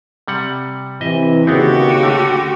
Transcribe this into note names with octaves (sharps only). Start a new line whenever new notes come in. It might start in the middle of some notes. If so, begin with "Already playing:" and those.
C3 G3 F#5
C3 E3 D#5 E5
D#2 A#2 C#3 B3 C4 F#4 G4
D3 A3